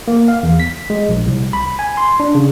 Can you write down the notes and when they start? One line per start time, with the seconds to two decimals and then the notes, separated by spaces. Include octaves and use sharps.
0.08 A#3
0.28 F5
0.43 E2
0.60 B6
0.90 G#3
1.09 A#1
1.26 C2
1.53 B5
1.79 G#5
1.97 C6
2.20 D4
2.35 C#3